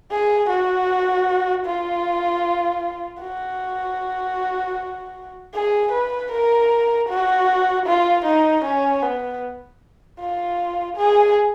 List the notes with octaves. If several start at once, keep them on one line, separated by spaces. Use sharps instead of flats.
G#4
F#4
F4
F#4
G#4
B4
A#4
F#4
F4
D#4
C#4
B3
F4
G#4